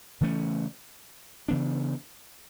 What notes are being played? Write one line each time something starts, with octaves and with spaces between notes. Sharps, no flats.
C#3 E3 A3 C#4
C#3 E3 B3 D4